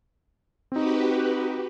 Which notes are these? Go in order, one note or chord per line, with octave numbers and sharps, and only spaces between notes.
C4 D#4 F#4 G4 B4